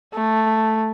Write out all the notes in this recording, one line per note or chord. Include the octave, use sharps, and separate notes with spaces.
A3